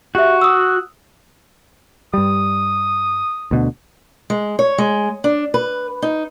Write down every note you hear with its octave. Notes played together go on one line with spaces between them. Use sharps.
F#4 G4 E5
D#6 E6
G2 G3 D#6
D2 B2 D3
G#3
C#5
G#3
D4
B4
D#4